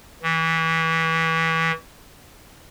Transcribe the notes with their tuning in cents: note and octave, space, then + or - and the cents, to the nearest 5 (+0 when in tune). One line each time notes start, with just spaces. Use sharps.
E3 -20